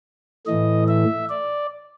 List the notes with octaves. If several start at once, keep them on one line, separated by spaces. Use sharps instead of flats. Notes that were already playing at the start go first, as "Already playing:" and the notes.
A2 E3 A3 D#5
E5
D5